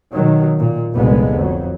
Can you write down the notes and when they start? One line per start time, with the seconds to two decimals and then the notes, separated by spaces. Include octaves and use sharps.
0.12 B2 D#3 F#3
0.58 A#2
0.94 F1 C2 A#2 D3 G#3 B3
1.38 F2 F#3